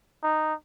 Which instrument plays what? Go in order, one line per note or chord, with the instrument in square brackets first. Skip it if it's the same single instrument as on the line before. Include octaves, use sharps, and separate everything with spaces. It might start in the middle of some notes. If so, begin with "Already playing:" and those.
[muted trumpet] D#4